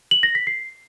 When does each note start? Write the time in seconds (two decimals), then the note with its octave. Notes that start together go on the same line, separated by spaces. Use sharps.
0.11 F#7
0.23 A#6
0.35 B6
0.47 C7